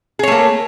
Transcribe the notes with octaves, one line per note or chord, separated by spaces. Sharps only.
A3 A#3 G#4 C#5